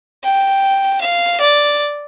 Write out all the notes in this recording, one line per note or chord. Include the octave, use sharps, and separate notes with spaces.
G5
F5
D5